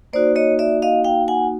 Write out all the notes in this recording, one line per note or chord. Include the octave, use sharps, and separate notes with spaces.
A#3 D#4 F#4 C5 D5
C#5 D#5
D5 E5
D#5 F5
F5 G5
F#5 G#5